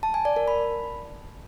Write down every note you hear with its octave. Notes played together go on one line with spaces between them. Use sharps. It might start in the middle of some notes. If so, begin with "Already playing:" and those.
A5
G#5
D5
A#4
B5